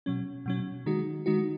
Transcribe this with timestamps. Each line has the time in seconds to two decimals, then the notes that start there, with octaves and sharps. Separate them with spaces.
0.06 B2 F#3 C#4
0.46 B2 F#3 C#4
0.86 D#3 G#3 D#4 F#4
1.26 D#3 G#3 D#4 F#4